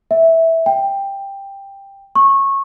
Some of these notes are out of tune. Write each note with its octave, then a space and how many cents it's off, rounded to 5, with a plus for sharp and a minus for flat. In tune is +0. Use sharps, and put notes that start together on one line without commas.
E5 -10
G5 +10
C#6 -20